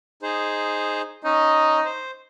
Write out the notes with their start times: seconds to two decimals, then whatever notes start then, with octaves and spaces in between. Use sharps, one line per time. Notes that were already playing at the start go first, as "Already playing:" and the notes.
0.22 D#4 G#4 C5
1.24 C#4 D#4 D#5
1.85 C5